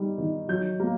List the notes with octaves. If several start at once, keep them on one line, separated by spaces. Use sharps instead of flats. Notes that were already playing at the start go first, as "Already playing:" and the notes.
Already playing: G3 D#4
D#3
F#3 G6
A#3